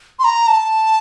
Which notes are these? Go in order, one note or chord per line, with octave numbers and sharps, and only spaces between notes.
C6
A#5
A5